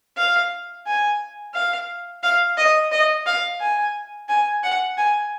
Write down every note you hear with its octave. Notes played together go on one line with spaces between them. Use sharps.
F5
G#5
F5
F5
D#5
D#5
F5
G#5
G#5
F#5
G#5